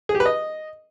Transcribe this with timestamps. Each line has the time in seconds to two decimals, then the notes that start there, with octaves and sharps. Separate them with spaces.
0.09 G#4
0.15 G4
0.20 B4
0.26 D#5